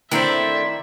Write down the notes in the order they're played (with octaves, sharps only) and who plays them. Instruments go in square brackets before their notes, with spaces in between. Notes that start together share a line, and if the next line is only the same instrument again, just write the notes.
[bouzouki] D#3 D5 [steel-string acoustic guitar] A3 C4 D4 [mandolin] E4 C5 [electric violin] E5